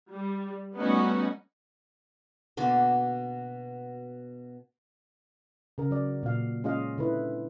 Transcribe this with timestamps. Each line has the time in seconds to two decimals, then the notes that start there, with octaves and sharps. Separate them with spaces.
0.11 G3
0.75 G3 A3 B3 C#4 D#4 F#4
2.57 B2 D3 A#3 F#4
5.78 C#3 A#4
5.91 F#3 D5
6.23 A#2 F5
6.64 G#3 C#4 F4 G#4 D#5 F5
6.98 D3 E4 B4